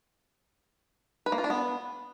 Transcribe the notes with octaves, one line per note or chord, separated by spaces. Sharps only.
B4
A#3
F4
D4
B3